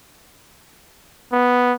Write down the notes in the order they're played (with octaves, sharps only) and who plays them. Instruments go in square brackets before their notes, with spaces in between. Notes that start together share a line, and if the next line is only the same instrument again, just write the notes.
[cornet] B3